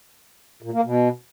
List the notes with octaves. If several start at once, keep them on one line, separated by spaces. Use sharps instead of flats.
A#2
A#3
B2